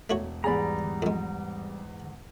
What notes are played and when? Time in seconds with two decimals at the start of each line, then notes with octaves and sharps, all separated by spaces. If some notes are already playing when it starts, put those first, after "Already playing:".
0.10 E1 A3 F#4 C#5
0.44 E2 G#2 G3 G#4 D5 A#5 B5
1.02 F2 G#3